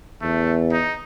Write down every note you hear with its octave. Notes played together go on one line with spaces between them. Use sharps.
E2 A3
D#4